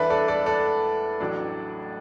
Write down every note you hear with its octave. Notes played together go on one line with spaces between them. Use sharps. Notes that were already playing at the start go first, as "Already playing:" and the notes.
Already playing: E2 E3 D4 A4 B4 D5 E5
A4 D5
A4 D5
A4 D5
A1 A2 F#3 D4